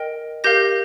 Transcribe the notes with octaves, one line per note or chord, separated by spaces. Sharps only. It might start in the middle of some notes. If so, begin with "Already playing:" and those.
Already playing: A#4 D#5 G5
G4 A#4 F5 G6 A#6